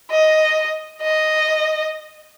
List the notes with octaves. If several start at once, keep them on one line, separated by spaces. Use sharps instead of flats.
D#5
D#5